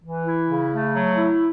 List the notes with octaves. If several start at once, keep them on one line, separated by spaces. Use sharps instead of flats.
E3
E4
C#3
A3
F#3
E4